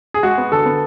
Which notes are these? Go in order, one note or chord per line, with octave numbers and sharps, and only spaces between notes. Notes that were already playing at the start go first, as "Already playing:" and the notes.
G#4
G#3 F#4
B3
D3 A4
B3